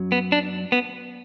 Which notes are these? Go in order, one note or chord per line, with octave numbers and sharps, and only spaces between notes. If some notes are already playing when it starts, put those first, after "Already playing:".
Already playing: F#2 F#3
B3
D4
B3